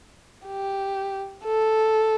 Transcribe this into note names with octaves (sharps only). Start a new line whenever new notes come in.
G4
A4